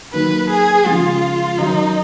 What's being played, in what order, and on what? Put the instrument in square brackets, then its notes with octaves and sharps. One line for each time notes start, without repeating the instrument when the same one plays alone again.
[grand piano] D#3 F#3 A#3 D#4 [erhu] B4
[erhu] G#4
[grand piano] C#3 F3 G#3 [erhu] F4
[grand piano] D#3 F#3 C#4 [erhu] D#4